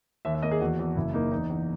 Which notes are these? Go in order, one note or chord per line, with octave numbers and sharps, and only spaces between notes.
D#2 E5
E5
A#3 D#5
G#4
E2 F#4
E2
F#1 E4
A#3 D#4
E2 D#4
E2